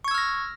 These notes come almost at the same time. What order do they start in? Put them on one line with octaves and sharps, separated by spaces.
C#6 G#6 E6 F6 A#6